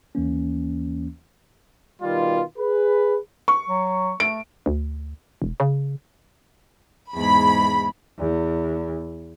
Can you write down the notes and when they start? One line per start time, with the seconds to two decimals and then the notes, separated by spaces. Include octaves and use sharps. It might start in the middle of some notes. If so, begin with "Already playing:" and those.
0.15 D#2 E3 A#3 C#4
2.01 B2 D#3 G3 F4
2.58 G#4 B4
3.48 C#6
3.68 F#3
4.20 A3 D7
4.66 D2
5.42 E1
5.60 C#3
7.14 E2 G#2 B5
8.19 E2